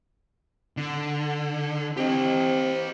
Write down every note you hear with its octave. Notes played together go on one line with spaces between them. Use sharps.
D3
C4 G4 D#5